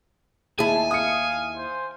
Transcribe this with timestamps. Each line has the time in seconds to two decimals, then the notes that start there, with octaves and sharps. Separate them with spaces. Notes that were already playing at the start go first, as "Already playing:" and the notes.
0.59 D#2 E4 G#4 G#5 A5
0.91 F5 D#6 C#7
1.57 C5